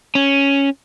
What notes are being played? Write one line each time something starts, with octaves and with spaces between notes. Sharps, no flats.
C#4